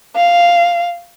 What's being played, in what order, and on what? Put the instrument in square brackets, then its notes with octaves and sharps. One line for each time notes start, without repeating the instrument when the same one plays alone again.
[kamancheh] F5